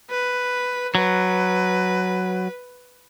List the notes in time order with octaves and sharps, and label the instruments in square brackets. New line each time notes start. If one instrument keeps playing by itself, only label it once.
[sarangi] B4
[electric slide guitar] F#3 [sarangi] B4